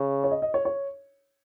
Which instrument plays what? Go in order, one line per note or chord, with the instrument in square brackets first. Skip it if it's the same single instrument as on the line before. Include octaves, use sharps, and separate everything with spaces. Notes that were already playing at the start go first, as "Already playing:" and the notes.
Already playing: [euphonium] C#3
[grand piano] C#5
D#5
D#5
C#5
C#5